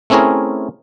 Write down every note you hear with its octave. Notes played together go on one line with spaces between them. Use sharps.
A3 C4 C#4 E4 G#4 A#4